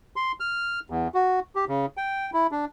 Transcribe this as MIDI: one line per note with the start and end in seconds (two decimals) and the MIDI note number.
0.16 0.32 84
0.40 0.80 89
0.90 1.08 40
1.14 1.40 66
1.55 1.65 67
1.68 1.86 49
1.97 2.30 79
2.33 2.47 64
2.51 2.65 62